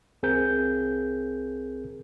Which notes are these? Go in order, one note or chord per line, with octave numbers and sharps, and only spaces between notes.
C2 C4 G#4 A#4 G6